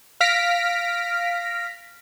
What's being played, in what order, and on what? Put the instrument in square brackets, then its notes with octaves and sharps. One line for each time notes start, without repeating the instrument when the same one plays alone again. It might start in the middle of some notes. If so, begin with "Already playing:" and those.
[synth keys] F5 F6 A#6 B6 D7